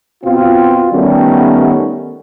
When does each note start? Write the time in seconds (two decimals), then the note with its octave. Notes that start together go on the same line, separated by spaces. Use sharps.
0.24 B2 C4 F4
0.92 D#3 G3 A3 B3 C#4